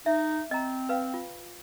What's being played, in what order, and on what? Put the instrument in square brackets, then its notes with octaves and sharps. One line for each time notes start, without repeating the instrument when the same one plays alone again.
[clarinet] D#4 [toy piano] E5
[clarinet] C4 [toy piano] D#5 A#5
[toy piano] B4 F5 G5
F4